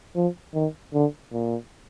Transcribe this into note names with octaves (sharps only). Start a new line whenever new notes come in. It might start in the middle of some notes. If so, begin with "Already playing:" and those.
F3
D#3
D3
A#2